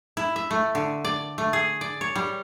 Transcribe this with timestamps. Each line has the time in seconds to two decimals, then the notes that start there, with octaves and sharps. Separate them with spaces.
0.17 E4
0.36 E5
0.51 A3
0.75 D3
1.05 D5
1.38 A3
1.53 G#4
1.81 D5
2.01 C#5
2.15 G3